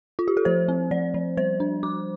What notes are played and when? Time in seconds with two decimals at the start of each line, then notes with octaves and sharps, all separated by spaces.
0.19 F4
0.28 G4
0.37 A4
0.45 F3 C5
0.68 C4
0.91 F3 D5
1.14 F3
1.37 G3 C5
1.60 D4
1.83 D4 D6